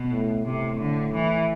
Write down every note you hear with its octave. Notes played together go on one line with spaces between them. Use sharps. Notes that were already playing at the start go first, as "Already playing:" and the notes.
Already playing: B2
A2
A2 C3
D3
E3